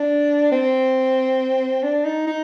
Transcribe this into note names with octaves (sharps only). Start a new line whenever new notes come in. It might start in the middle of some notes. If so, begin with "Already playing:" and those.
Already playing: D4
C4
D4
D#4
D#4